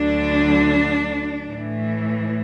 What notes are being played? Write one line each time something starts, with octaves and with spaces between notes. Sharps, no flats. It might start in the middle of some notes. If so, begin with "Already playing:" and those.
Already playing: D2 D3 F#3 D4
A2 E3